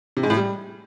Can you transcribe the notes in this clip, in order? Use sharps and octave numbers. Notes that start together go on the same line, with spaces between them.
C3
G#2
A2
G3